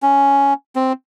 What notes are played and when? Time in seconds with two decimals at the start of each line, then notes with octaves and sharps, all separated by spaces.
0.03 C#4
0.76 C4